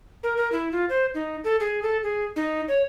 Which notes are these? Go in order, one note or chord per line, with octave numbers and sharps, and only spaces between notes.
A#4
A#4
E4
F4
C5
D#4
A4
G#4
A4
G#4
D#4
C#5